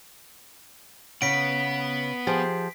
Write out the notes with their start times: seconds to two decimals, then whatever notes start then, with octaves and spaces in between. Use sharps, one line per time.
1.22 C#3 B3 F#5 B6 D7
2.27 F3 G4 G#4